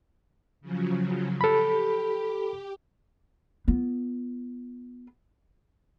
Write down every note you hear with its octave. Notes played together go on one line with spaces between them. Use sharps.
C#3 F3 F#3
G4 A4 B5
B3 F4